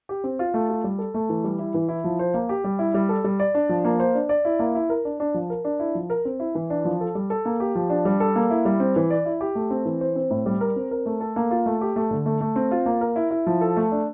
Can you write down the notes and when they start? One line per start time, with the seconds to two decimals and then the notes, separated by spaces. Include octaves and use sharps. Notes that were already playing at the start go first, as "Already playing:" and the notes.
0.09 G4
0.24 C4
0.39 F4
0.54 A3
0.69 F4
0.84 G3
0.99 A4
1.14 A3
1.29 E3
1.44 G3
1.59 E4
1.74 E3
1.89 E4
2.04 F3
2.19 C5
2.34 A#3
2.49 G4
2.64 G3
2.79 E4
2.94 G3
3.09 A4
3.24 G3
3.40 D5
3.55 D4
3.69 F3
3.85 A#3
4.00 C5
4.15 D4
4.29 D5
4.45 E4
4.59 A#3
4.75 E4
4.90 A#4
5.05 D4
5.20 D4
5.34 F3
5.50 A#4
5.65 D4
5.80 E4
5.95 F3
6.10 A#4
6.25 C4
6.40 E4
6.55 E3
6.70 D4
6.85 F3
7.01 A4
7.15 G3
7.30 A4
7.45 A#3
7.60 G4
7.75 F3
7.90 D4
8.05 G3
8.20 A4
8.36 A#3
8.50 E4
8.65 G3
8.80 C4
8.96 E3
9.10 D5
9.26 E4
9.41 G4
9.55 A3
9.71 C4
9.85 E3
10.01 C5
10.16 C4
10.30 A2
10.46 G3
10.61 A#4
10.76 C4
10.91 A#4
11.06 A3
11.20 A4
11.36 A#3
11.51 F4
11.66 A3
11.81 G4
11.96 A3
12.11 D3
12.26 A3
12.41 A3
12.56 C4
12.71 F4
12.86 A#3
13.01 A#4
13.16 E4
13.31 E4
13.47 F3
13.61 A4
13.76 A3
13.92 D4